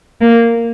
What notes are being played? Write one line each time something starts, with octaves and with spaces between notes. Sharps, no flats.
A#3